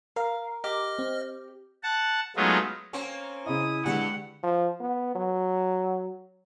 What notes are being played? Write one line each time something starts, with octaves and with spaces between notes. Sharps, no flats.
A#4 F5
G4 D#5 F6
C4
F#5 A5
F#3 G#3 A3 B3 D#4 F4
A#3 C4 C#4
C#3 E4 D#5 D#6
G2 D3 G#3 G4 F#5
F3
B3
F#3